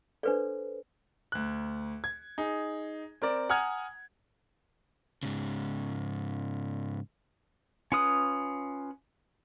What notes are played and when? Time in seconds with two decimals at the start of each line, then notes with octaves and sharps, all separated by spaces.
0.23 D4 A4 B4 C5 D5
1.32 D2 F#6
2.04 G#6
2.38 D#4 G#4
3.22 C4 A#4 D5
3.49 F#5 G#5 A#5 D#6 F6 G#6
5.23 G#2 C#3
7.92 C#4 F4 B4 D#6